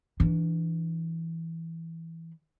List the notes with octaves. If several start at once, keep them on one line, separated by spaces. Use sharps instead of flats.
E3 D4